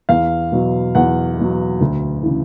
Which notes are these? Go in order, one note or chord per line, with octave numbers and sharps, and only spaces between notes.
E2 F5
B2 F#3
E2 F#5
B2 F#3
D2
C#3 E3